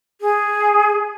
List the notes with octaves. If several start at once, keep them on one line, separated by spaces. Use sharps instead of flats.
G#4